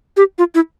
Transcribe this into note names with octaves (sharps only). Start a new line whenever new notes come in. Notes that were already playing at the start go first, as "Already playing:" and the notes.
G4
F4
E4